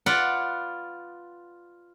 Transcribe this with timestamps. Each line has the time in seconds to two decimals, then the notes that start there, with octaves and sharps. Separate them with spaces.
0.06 F4 B4 D5 F#5